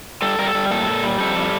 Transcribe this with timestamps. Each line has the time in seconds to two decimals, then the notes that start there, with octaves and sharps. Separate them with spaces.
0.22 G3 A4
0.38 G3 A#4
0.47 A4
0.55 G3
0.70 A#2 A4
0.87 A#2
1.04 G3
1.20 F2 A4
1.36 G3